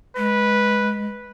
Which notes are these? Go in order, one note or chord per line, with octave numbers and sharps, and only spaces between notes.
G#3 B4